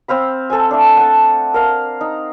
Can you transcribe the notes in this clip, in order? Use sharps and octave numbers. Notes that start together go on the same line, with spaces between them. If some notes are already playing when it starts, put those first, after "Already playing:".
C4 C5 F5 B5
A4 C5 G#5
A3 D4
F#5 A5
A#4 F5
D#4